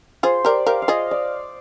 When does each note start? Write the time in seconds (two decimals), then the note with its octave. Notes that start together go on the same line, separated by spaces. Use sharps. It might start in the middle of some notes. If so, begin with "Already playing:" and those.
0.23 F4 G#4 C5
0.45 G4 A#4 D5
0.66 G4 A#4 F5
0.82 F5
0.88 F4 G#4 D#5
1.11 D5